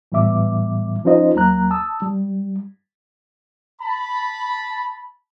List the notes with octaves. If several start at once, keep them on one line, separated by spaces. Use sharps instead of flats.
A2 E3 G3 B3 E5 D6
F3 C#4 D#4 F4 C5 D#5
D#2 F#3 A#3 A#5 F#6
A5 D#6 E6
G3
A5 B5